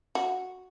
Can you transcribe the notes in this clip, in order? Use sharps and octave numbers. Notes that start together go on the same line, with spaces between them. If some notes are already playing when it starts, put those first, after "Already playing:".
F#4